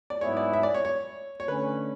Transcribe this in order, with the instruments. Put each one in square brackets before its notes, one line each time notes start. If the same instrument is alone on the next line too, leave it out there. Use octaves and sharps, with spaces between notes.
[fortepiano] D5
[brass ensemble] G#2 F#3 B3 E4 G#4 [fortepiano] C#5
[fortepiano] D5
E5
D5
C#5
C#5
C#5
[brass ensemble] D3 A3 C#4 [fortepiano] B4